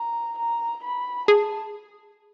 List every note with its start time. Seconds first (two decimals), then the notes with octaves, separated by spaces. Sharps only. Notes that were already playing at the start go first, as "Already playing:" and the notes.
Already playing: A#5
0.38 A#5
0.84 B5
1.28 G#4 A5